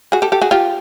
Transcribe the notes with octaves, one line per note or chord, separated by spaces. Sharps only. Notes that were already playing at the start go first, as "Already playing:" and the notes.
F#4 G#4
G4 A4
G4 A4
F#4 G#4
F4 G4